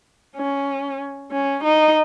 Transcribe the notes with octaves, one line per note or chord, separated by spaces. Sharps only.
C#4
C#4
D#4